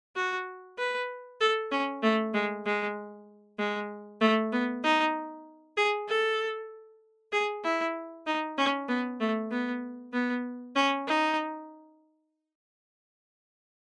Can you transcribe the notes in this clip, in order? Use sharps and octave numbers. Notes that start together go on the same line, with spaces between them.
F#4
B4
A4
C#4
A3
G#3
G#3
G#3
A3
B3
D#4
G#4
A4
G#4
E4
D#4
C#4
B3
A3
B3
B3
C#4
D#4